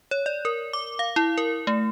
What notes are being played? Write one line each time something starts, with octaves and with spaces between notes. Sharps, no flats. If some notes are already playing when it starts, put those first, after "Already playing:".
C#5
D5
A#4
D6
F5
E4
A#4
A3